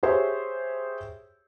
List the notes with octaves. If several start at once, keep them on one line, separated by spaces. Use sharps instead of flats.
G4 G#4 C5 C#5 E5